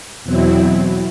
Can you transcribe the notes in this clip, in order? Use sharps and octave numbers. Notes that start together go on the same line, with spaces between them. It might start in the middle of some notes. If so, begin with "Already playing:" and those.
E2 B2 F#3 C4 E4